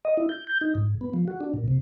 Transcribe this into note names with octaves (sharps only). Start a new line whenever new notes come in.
D#5
E4
G6
G6
D#4
G#2
B3
F3
F#4
D4
A#2
C3